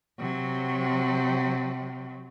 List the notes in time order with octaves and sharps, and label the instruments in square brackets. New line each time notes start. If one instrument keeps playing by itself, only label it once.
[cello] C3 F#3